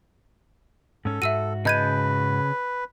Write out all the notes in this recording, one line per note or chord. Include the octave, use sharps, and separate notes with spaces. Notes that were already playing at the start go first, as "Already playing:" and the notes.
G#2 C#4 A4
G#2 F#4 E5 E6 D#7
C#3 B4 D#5 A5 G6 G#6 D#7